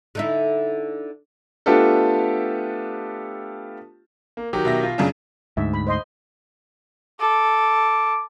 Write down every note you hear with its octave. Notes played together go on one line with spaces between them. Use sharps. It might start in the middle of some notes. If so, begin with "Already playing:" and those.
D3 D#4 E4
A3 B3 D4 F4 G4 A4
A#3
D#3 F#3 G4
B2 E5 A#6
F4
F#2 C#3 D4
D2 G#2 E5
B5
C5 D#5 C6
A4 D6